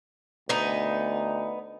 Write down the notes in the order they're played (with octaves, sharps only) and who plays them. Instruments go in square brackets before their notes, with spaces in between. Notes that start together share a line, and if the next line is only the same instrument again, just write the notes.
[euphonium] D2 [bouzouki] B3 D#4